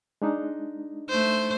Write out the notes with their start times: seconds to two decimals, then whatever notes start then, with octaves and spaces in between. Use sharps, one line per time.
0.22 G#3 D4 D#4
1.09 A3 C5